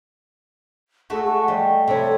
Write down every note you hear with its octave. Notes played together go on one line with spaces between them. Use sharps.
G#3 A3 F#4 G#4 A4
F#5 C#6
G3 D#5
C3 E4 A4 C#5